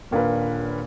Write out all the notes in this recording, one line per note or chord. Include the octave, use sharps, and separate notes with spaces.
D#1 A#2 D4 A#4 B4